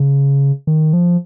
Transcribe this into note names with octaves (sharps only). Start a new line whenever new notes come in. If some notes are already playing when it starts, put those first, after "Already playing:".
Already playing: C#3
D#3
F3